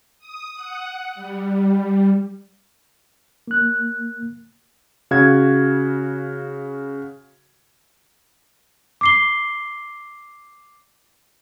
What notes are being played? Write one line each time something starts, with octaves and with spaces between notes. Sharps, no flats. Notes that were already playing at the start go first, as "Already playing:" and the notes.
D#6
F#5
G3
A#3 F#6
C#3 F#4 F5 G#6
D6 C7 G7